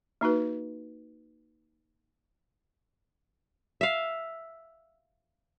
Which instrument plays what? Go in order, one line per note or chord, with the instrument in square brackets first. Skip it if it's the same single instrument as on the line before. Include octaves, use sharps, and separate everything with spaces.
[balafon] A#3 D#4 F#4 B4
[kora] E5 F5